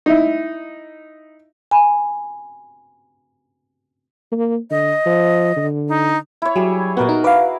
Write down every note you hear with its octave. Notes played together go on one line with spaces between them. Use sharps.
D#4 E4
G#5 B5
A#3
D3 D#5
F3
D3
D#4
E4 C#5
F#3 G3 G#4
A#2 B3 F#4 A#4 D#5
D#4
E4 B4 F5 D6